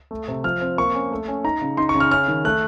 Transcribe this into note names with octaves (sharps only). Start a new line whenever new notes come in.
A3
C3
F3 F6
C4
A#3 C#6
C#4
A3
C#4
D#4 A#5
C#3
D#4 C6
C#6
C#3
F6
C#4 F6
D#3
A3 F#6